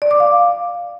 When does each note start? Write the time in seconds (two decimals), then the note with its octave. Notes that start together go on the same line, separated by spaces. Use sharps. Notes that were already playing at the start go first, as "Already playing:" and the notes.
0.02 D5
0.11 D6
0.20 F5